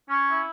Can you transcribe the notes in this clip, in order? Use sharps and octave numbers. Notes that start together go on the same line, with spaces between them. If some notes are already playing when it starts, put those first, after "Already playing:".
C#4
E4